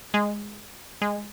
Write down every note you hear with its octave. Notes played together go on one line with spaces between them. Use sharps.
G#3
G#3